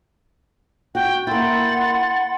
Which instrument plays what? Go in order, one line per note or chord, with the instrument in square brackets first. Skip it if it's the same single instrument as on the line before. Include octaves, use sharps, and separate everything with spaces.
[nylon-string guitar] F#4 [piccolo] G5
[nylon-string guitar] A#3 E4 [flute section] F#5 B5 C6 [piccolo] A6